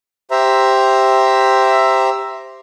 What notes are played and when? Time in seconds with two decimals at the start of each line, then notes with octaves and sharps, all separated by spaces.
0.31 G4 C5 E5 A#5